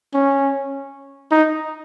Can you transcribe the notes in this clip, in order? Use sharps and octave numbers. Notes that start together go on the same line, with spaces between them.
C#4
D#4